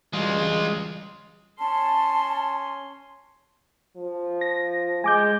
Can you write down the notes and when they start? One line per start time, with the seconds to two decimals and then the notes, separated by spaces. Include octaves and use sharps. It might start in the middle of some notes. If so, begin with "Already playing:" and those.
0.13 E3 G3 G#3 F4 F#4
1.58 C#4 A5 C6
3.97 F3
4.41 A#6
5.04 G#3 G#5 D6 G6